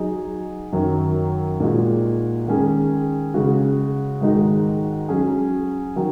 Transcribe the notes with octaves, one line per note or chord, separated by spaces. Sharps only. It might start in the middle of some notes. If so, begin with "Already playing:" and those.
Already playing: F#3 D#4 G#4
F#2 D#3 F#3
A#2 G#3 D#4 F#4
D#3 G#3 C#4 G#4
C#3 G#3 F#4
G#2 D#3 G#3 D#4 F#4
F#3 C#4 G#4
D#3 F#3